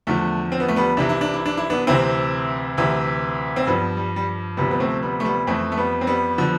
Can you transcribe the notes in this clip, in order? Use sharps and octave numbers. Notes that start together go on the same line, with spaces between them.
E2 D3 F3 A3
C4
B3
A3
G3 B3
C2 C3 E3 D4
E4
D4
E4
D4
E4
B3 D4
D2 C3 E3 C4 E4
D2 C3 E3
C4
G2 F3 G3 B3
G3
G3
D2 C3 F3 G3 B3
B3
A3 C4
G3 B3
A3
G3 B3
F2 E3 A3 C4
A3
G3 B3
C4
G3 B3
D3 F3